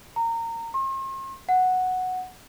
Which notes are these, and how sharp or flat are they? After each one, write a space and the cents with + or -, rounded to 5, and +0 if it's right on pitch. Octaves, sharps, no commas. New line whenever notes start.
A#5 -25
C6 +45
F#5 -5